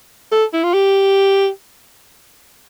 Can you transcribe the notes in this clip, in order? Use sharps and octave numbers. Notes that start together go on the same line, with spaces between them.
A4
E4
F4
G4